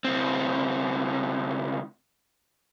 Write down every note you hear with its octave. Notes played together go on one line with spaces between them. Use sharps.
C#2 C4